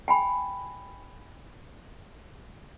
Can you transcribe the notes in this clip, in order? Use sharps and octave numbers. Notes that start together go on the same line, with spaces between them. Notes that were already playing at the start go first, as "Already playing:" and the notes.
G5 G#5 B5